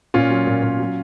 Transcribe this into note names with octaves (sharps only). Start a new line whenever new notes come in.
A#2 C#4 F4
F#3
A#2
A#2
F#3